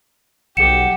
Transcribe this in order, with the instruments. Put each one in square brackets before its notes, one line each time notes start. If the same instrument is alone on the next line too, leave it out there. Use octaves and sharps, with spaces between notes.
[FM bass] B1 [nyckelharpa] G4 [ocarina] F#5 [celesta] C#7 E7